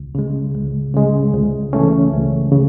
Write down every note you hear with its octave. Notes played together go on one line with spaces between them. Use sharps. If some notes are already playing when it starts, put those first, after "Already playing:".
Already playing: C#2
C#3 G#3
C#2
C#3 G#3
C#2
C#3 E3 A3 C#4
C#2
C#3